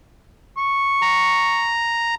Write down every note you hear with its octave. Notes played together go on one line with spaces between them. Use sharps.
C#6
A#5